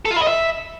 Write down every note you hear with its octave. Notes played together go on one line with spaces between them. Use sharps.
A4
F4
E4
D#5
E5